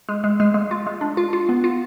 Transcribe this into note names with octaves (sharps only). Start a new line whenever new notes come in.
G#3
G#3
G#3
G#3
F4
G#3
D4
F4
F4
B3
F4